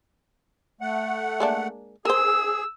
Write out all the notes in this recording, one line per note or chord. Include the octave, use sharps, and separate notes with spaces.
A3 F#5
G#3 A#3 D4
G#4 A#4 C5 E6